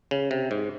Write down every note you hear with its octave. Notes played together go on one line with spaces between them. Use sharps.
C#3
C3
G#2